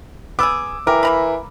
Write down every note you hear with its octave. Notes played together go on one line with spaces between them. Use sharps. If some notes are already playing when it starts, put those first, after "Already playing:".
B3 G#4 D6 E6
E3 G4 A#4
A#3 A#5 B5